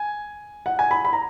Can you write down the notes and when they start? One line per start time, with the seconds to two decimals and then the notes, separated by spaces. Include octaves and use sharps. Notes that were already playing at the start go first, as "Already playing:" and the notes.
Already playing: G#5
0.66 F#5
0.79 G#5
0.91 B5
1.05 B5
1.13 A#5